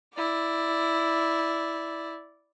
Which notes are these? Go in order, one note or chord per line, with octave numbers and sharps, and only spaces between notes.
E4 D5